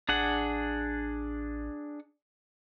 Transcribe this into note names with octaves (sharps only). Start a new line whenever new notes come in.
A1 D4 G#4 F#5